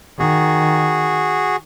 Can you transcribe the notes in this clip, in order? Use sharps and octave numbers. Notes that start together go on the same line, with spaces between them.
D#3 F#4 G#4